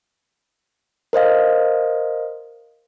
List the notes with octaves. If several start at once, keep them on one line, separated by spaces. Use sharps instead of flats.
A#4 C5 D#5 F5